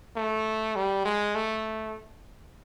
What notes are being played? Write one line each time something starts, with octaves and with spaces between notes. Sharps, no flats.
A3
G3
G#3
A3